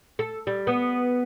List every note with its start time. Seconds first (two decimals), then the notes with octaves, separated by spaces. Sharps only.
0.19 A4
0.47 G3
0.67 B3